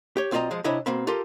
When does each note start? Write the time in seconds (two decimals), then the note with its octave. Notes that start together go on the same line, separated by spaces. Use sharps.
0.17 G4 C#5
0.31 B1 C4 F4 D5 D#5 A#5
0.51 F3 G#3
0.64 C3 D4 E4 C#5 D#5 B5
0.86 B2 A#3 C4 B5
1.07 F4 G4 A4 A#4 C6